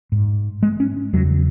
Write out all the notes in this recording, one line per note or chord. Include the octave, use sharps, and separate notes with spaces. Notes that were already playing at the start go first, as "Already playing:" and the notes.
G#2
G#3
C#4
E2 C#3 F#3